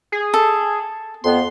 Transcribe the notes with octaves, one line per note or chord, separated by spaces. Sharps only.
G#4
A4
F2 B3 C6